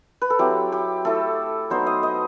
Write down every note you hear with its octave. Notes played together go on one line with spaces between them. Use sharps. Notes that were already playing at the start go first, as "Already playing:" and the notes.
B4
A4
F#3 C4 E4 G4
G4
A3 E4 A4
F#3 B3 D#4 C5
D#5
D#5